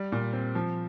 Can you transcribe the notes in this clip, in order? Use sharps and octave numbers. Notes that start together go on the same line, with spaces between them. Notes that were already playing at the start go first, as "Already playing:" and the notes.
Already playing: G3
A#2
C4
F3